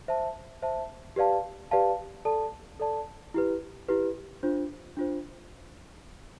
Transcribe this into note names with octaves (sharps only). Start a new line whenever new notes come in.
C5 E5 A5
C5 E5 A5
G4 B4 D5 F5 A5
G4 B4 D5 F5 A5
A4 D5 A5
A4 D5 A5
E4 G4 B4
E4 G4 B4
D4 F4 C5
D4 F4 C5